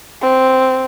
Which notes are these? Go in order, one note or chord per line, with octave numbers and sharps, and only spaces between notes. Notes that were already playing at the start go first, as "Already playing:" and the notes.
C4